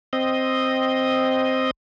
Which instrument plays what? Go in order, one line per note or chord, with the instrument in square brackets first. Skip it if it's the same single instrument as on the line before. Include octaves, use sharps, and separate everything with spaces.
[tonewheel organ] C4 D#5